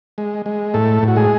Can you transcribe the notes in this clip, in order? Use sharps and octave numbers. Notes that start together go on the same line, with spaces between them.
G#3
G#3
A2 A3 A4
A2
F#4
G#3 G#4